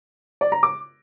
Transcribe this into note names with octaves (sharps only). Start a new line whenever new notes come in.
D5
A#5
D6